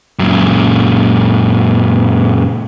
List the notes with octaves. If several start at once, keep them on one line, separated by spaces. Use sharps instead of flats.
F#2 A#2